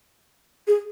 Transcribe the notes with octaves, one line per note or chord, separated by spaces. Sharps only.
G#4